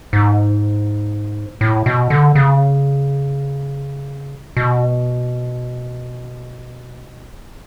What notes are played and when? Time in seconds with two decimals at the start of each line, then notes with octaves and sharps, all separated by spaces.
0.13 G#2
1.61 A2
1.86 B2
2.10 D3
2.35 C#3
4.57 B2